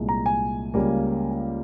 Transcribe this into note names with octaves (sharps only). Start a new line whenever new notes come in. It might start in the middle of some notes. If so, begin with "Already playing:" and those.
Already playing: C2 A#2 G#3
A#5
G#5
C#2 C#3 G3 A#3